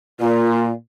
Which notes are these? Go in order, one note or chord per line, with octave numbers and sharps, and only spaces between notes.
A#2 F4